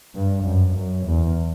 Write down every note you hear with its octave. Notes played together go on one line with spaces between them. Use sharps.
G2
F#2
F#2
E2